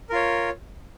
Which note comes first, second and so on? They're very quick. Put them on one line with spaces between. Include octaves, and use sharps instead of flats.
A#4 F4 C#5